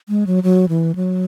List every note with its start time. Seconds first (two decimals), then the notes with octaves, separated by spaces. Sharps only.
0.09 G#3
0.27 F#3
0.43 F#3
0.69 E3
0.95 F#3